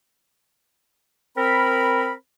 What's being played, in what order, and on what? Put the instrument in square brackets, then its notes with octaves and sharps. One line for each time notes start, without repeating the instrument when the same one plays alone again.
[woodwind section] C4 A#4 B5